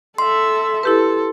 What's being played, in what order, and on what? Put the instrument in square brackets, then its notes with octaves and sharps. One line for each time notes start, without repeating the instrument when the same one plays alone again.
[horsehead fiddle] A4 E5 [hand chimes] C6
[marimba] E4 G4 B4 [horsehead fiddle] A4